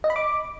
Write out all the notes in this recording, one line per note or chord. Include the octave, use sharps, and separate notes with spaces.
D#5
B5
D6